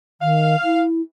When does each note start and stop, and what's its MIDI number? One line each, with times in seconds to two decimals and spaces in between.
0.21 0.56 51
0.21 0.82 77
0.64 1.01 64